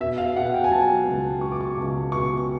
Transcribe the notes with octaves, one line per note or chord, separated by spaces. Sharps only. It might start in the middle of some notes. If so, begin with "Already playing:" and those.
B2 E5
F5
B2 F#5
G5
G#5
F#3 A5
C#2
B2 C#6
D6
C#6
C#2
B2 C#6